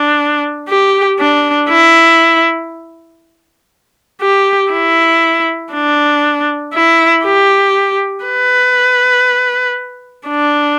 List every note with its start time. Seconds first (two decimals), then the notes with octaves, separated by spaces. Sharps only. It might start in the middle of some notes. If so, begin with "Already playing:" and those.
Already playing: D4
0.69 G4
1.19 D4
1.69 E4
4.21 G4
4.72 E4
5.73 D4
6.74 E4
7.24 G4
8.25 B4
10.27 D4